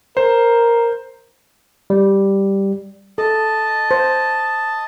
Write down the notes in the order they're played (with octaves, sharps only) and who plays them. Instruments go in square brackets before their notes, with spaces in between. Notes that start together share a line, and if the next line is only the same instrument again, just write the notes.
[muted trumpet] A#4 [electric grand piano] C5
[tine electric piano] G3
[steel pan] A4 [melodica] D#5 A5
[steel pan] C5